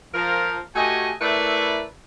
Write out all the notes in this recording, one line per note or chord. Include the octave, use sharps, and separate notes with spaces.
F3 A#4
A3 F#4 G4 D#5 G#5
A3 E4 A#4 B4 D5 E5